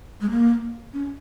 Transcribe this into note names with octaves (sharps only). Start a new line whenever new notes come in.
G#3
A#3
C#4